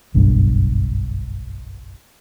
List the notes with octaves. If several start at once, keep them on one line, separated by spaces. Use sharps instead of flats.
F#1 B1 G2